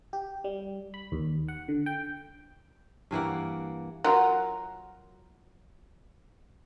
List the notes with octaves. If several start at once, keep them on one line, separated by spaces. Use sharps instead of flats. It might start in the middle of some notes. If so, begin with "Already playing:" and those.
G4
G3
B5
D#2
F#5
D3
G5
G2 E3 A#3 F#5
F#3 F4 A#4